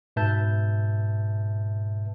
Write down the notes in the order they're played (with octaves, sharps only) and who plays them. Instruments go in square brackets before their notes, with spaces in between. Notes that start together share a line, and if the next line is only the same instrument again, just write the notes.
[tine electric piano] G#2 B2 B4 E5 A5 G6